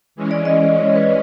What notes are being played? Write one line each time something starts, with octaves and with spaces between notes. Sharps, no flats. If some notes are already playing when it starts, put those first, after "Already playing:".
E3 G#3 C#4
D5
D#5
D5
C#5
B4